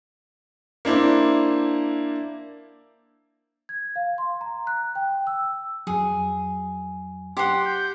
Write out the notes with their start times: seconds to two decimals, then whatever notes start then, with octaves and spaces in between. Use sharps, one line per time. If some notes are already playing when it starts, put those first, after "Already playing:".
0.85 A#3 D4 E4 C5
3.69 G#6
3.96 F5
4.18 C6
4.41 A#5
4.67 F#6
4.95 G5
5.27 E6
5.87 F2 F#3 G#4
7.37 G4 F#5 C6
7.65 G6